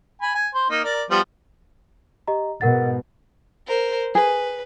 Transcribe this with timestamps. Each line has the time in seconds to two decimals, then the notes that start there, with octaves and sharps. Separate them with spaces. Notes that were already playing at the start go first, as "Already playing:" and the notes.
0.22 G#5 B5
0.35 G#5
0.55 C5
0.70 A#3 D#4
0.84 A#4 D5
1.11 F3 G3 B3
2.27 G4 D#5 A#5
2.61 G#2 B2 A#4 F#5 A6
3.67 A#4 C5
4.15 G#4 B4